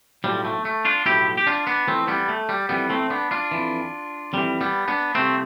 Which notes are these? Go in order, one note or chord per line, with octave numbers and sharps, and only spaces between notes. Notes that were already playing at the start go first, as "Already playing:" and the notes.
B1 A2 F3 G3
A3
A3
D4 F4
B1 A2 F3 E4 G4
G4
D4 F4
B3 D4
F2 E3 A3 C4
G3 B3
A3
G3
F2 E3 G3 B3
A3 C4
B3 D4
D4 F4
F2 E3
F2 E3 G3
G3 B3
B3 D4
C2 C3 F3 A3 C4